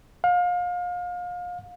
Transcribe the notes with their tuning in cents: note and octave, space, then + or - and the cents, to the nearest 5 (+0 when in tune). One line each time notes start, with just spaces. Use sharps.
F5 +30